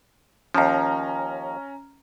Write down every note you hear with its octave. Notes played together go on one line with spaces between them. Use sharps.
D#2 F3 C#4 A#5